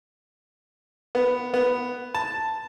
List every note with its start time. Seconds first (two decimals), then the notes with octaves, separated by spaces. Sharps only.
1.15 B3
1.54 B3
2.15 A5